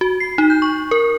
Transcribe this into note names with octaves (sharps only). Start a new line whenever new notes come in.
F#4
C7
D#4
G6
C#6
A#4